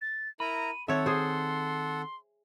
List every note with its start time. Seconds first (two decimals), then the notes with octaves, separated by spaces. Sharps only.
0.02 A6
0.40 E4 A#4 A#5 B5 D#7
0.88 D#3 C4 A4 C#5 E5 F#5
1.06 G#4 C5 C6